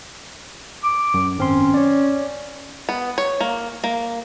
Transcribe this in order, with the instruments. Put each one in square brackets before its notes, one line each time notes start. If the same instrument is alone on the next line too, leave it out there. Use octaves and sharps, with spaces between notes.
[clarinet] D6
[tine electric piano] F#2
[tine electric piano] G#1 C4 C6 [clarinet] C#4
[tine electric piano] C#5 D5
[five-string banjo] B3
C#5
A#3
A#3